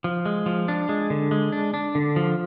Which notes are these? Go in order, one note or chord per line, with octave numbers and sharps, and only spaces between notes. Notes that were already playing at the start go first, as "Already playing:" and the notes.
F3
G#3
F3
D4
G#3
D3
G#3
D4
D4
D3
F3